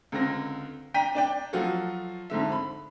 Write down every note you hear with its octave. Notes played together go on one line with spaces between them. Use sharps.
C#2 D3 C4 A#6
D4 G5 A#5 B6 D#7
D4 D5 G5
F3 F#3 F4 F#4 A4
F2 G#2 D3 E5
B5